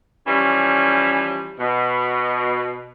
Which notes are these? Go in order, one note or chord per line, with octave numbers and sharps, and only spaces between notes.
E3 F3 G3 C#4
B2